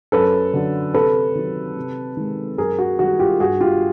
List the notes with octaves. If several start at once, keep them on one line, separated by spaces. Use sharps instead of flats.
F#2 A4 B4
D3 F#3
C3 A4 B4
D#3 F#3
C3
D#3 G#3
F#2 G#4 A#4
F#4
D#3 G3 F#4
F4 G4
G2 F#4 G#4
F4 G4